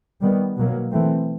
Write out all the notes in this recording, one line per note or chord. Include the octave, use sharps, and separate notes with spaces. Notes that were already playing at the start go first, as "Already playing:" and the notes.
D#3 G3 B3
B2 F#3 A#3
E3 A3 C4